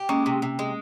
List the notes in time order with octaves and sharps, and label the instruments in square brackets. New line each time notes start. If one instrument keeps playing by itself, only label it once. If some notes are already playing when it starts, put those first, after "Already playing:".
Already playing: [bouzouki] G4
[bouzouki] G#3 [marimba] A#3 C#4
[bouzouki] C3
C3
G#3